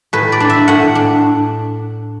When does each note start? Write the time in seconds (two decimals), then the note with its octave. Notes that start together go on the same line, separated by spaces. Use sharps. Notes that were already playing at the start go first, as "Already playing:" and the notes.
0.13 A2 B4
0.32 D5
0.40 D4
0.50 E5
0.68 A2 F#5
0.95 D4